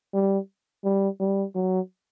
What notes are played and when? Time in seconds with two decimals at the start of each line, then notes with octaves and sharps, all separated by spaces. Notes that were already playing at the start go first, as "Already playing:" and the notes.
0.14 G3
0.84 G3
1.20 G3
1.55 F#3